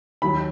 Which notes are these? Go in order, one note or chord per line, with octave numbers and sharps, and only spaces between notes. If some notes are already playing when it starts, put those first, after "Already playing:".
D#2 D#3 F#3 B5